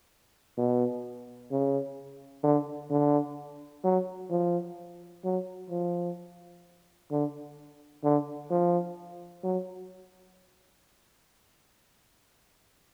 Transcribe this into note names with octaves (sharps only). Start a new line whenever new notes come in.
B2
C#3
D3
D3
F#3
F3
F#3
F3
D3
D3
F3
F#3